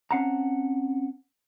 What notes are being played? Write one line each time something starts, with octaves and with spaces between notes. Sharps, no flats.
C4 C#4 F5 F#5 A5 A#5